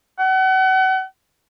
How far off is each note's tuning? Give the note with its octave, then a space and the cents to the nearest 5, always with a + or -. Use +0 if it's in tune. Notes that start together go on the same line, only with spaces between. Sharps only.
F#5 +35